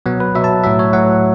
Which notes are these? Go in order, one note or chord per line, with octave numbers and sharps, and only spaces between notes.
B2 F#3 B3
B4
B2 F#3 E5
A5
A2 F#3 E5
C#5
A2 F#3 F#5